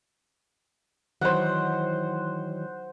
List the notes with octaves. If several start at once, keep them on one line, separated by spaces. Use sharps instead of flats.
D#3 E3 F#3 C5 F#5